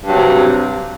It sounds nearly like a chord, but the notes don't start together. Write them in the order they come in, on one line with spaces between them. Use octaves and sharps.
G2 F#3 C3